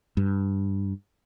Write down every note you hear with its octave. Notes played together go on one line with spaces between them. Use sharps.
G2